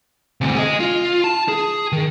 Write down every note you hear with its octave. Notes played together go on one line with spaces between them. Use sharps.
D2 C3
G#4 D#5
F4
A5
G#4
D#3